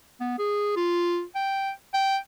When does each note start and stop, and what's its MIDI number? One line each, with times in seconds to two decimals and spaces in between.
0.20 0.38 59
0.38 0.76 68
0.76 1.23 65
1.35 1.71 79
1.94 2.17 79